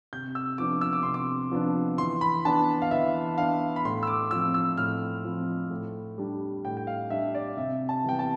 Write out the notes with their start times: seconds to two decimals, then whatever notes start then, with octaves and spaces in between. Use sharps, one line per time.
0.13 C3 G6
0.35 E6
0.58 F3 B3 D4 D6
0.81 E6
0.93 D6
1.03 C3 C6
1.14 D6
1.51 F3 B3 D4
1.98 E3 C6
2.21 B5
2.45 B3 D4 A5
2.82 F5
2.91 E3 E5
3.38 B3 D4 F5
3.76 B5
3.85 A2 C6
4.03 E6
4.07 D6
4.31 F3 C4 E6
4.54 E6
4.77 A2 F6
5.25 F3 C4
5.70 A2
6.18 G3 D4
6.65 A2 G5
6.77 G5
6.87 F5
7.10 G3 D4 E5
7.35 D5
7.57 C3 E5
7.89 A5
8.04 E3 G3 B3 G5
8.19 A5